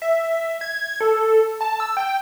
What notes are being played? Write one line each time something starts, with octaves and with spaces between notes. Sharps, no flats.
E5
G#6
A4
A5
E6
G5